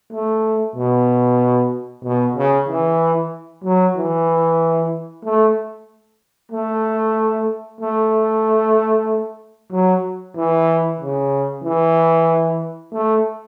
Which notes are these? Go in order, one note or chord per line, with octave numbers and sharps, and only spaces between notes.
A3
B2
B2
C#3
E3
F#3
E3
A3
A3
A3
F#3
E3
C#3
E3
A3